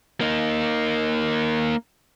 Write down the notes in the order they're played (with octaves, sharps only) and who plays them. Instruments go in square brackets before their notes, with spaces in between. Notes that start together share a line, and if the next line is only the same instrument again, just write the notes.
[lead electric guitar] A#3 D#4